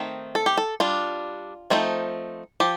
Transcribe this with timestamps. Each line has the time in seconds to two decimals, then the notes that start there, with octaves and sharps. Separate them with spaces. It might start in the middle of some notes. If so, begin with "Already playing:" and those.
Already playing: D#3 A3 C4 D#4
0.35 A4
0.46 G4
0.57 A4
0.80 G3 D4 F4
1.70 F3 A3 C4 D#4
2.60 F3 G4